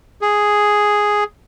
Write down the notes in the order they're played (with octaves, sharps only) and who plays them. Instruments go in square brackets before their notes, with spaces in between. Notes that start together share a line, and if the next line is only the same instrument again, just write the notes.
[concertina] G#4